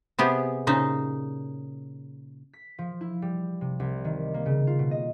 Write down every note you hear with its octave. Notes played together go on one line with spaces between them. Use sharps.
C3 B3 G4 G#4
A#2 C#3 D#4 C5
B6
F3
E4
G3
C3
C2
D#3
A#3
C#3
F4
B2
D#5